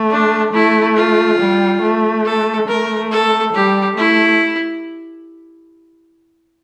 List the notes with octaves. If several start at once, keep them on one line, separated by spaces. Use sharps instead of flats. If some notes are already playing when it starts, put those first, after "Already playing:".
Already playing: A3
D4
A3 E4
F4
G3
A3
A4
A3 A#4
A4
G3 G4
A3 E4